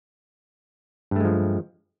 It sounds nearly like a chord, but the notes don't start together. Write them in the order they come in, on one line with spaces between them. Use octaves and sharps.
G2 A3 G#3 F3